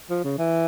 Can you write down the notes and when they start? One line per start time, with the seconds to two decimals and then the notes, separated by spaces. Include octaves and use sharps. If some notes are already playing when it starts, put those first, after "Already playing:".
0.10 F3
0.24 C#3
0.38 E3